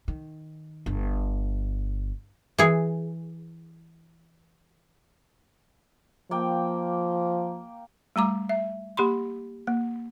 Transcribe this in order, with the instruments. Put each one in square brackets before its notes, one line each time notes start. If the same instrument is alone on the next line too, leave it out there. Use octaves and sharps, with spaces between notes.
[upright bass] D#3
G1
[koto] E3 G#4
[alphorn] F3 [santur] A#3 G5
[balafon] G3 A3 A#5 D6
E5
A#3 G4 B5 C6
A#3